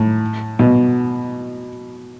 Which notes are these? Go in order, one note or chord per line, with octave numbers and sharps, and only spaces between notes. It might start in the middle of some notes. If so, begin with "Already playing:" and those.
Already playing: A2
B2